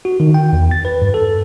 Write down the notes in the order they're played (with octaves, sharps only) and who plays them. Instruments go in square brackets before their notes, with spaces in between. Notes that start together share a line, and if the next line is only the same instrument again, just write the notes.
[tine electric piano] F#4
D#3
G5
E2
A6
B4
G2
A4